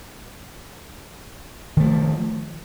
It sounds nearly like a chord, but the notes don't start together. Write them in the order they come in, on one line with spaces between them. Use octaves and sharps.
D#3 A3 F3